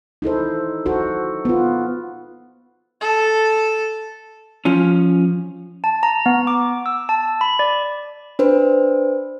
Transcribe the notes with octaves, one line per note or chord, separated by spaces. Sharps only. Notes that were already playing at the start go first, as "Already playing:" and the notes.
D#4 E4 A4 C5
D#4 F#4 A4 C5
B3 F4
A4
F3 C#4
A5
A#5
B3
D6
E6
A5
B5
D5
D4 B4 C5